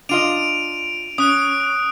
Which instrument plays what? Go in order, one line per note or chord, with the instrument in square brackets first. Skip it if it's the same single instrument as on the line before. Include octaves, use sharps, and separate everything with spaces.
[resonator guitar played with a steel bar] D4 F4 D#5 [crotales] D7 D#7 F7
[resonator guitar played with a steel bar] C#4 [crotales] D#6 F#6 D7